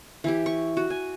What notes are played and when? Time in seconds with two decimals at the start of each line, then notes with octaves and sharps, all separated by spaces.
0.24 E3 E4 G4
0.46 C#6
0.77 F#4
0.90 G#5